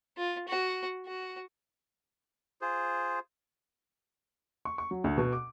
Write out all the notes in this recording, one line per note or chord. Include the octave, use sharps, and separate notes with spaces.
F4
F#4
F#4
F4 G#4 C5
C#6
C#6
F#3
D2
B2
D6